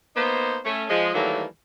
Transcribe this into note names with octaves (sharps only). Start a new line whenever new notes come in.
A#3 B3 D#4 C5
A3 C#4
F3 G#3
D#3 E3 F#3 G3 A3 A#3